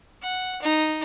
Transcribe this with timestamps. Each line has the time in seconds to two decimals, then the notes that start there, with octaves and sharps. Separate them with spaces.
0.22 F#5
0.62 D#4